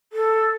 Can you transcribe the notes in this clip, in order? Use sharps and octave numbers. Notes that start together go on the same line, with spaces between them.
A4